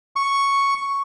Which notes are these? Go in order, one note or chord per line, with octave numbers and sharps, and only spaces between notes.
C#6